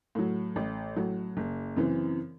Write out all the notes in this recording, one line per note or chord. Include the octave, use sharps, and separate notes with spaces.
A2 F#3
A1
A2 F#3
F#1
F#2 C#3 E3 C4